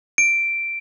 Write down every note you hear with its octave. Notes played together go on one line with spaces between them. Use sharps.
D7